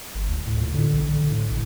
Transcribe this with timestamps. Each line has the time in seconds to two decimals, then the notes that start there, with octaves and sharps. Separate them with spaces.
0.15 G1
0.28 D2
0.47 A2
0.61 A#2
0.74 D3
0.93 B1
1.09 D3
1.30 A2
1.51 A1